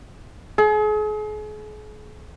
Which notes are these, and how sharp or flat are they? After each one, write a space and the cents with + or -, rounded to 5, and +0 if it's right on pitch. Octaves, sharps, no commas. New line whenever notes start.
G#4 +40